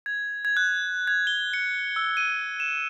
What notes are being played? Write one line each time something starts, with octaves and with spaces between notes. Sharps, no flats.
G#6
G#6
F#6
G#6
G7
C#7
E6
D#7
E7